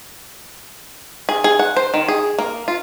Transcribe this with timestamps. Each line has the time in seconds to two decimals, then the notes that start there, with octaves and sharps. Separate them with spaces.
1.29 G#4
1.44 G#4
1.59 F#5
1.77 C5
1.94 D#3
2.08 G#4
2.38 A#3
2.68 F4